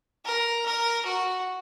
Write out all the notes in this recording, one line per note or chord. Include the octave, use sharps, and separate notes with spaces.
A#4
A#4
F#4